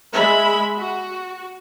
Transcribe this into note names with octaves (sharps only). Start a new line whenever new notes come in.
G#3 E5 B5
F#4